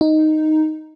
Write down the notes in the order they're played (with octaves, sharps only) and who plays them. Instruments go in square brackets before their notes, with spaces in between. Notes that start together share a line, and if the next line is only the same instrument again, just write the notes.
[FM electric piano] D#4